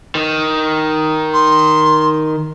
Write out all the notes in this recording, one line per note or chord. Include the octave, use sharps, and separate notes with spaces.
D#3
C6